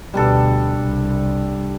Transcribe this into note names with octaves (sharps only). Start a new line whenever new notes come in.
D2 B2 G3 D4 A4
C2